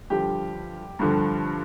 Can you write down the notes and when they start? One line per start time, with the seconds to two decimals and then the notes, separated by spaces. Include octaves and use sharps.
0.10 G2 D3 F3 G4
0.99 G2 D3 F3